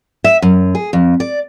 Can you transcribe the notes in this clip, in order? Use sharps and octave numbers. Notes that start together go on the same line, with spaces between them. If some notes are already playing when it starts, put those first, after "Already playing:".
E5
F#2
G#4
F2
D5